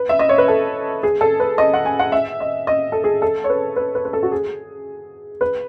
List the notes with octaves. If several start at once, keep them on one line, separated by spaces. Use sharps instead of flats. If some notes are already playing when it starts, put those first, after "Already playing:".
Already playing: B4
E5
D#5
C#5
B4
A4
G#4
A4
B4
D#5
F#5
G#5
F#5
E5
D#5
D#5
A4
G#4
A4
C#5
B4
B4
B4
B4
A4
F#4
G#4
B4